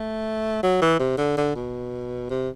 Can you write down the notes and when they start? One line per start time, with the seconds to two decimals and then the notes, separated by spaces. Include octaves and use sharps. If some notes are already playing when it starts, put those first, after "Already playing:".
Already playing: A3
0.63 F#3
0.82 E3
0.99 C3
1.18 D3
1.37 D3
1.56 B2
2.30 C3